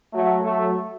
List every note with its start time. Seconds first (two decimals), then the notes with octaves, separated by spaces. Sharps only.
0.13 F#3 A3
0.44 F#3 A3